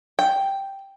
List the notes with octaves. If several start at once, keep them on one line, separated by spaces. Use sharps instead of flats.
G5